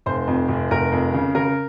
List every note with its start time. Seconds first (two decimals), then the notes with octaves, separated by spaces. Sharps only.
0.06 F1 C5
0.27 F2
0.49 F1
0.71 F1 A#4
0.92 F2
1.14 C#3
1.35 C#3 A#4